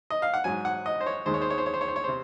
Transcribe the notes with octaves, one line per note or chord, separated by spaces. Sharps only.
D#5
F5
F#5
G#2 F#3 G#5
F#5
D#5
C5
C#5
D#2 D#3 G#3 C5
C#5
C5
C#5
C5
C#5
C5
C#5
C5
C#5
C3 C5